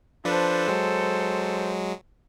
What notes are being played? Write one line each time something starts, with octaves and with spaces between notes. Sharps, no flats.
F3 D4 A4 B4 C5
F#3 G#3